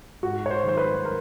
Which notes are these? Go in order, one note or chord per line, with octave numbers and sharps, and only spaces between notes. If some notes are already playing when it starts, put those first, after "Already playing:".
G#2 F#4
C#5
C5
D#3 F#3 C5
B4
A#4